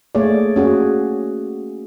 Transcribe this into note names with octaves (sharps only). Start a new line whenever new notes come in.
A3 A#3 G#4 C#5 D5
C#4 F#4 G#4